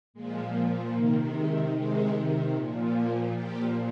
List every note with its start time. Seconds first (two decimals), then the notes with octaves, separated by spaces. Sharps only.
0.14 A#2 F3 G#3
0.93 C3 D#3 A#3
1.33 G#3
1.74 C3 D#3 G#3
2.53 A#2 F3
2.93 A#3
3.33 A#2 F3 G4